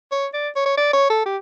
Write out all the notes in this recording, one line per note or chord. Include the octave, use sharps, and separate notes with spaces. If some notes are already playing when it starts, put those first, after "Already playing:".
C#5
D5
C#5
C#5
D5
C#5
A4
G4